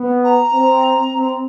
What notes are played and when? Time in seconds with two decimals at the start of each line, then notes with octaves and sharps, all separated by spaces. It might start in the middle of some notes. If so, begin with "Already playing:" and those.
Already playing: B3
0.23 A#5
0.53 C4
1.13 C4